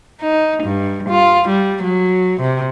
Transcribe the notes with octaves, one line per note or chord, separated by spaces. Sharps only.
D#4
G2
F4
G3
F#3
C3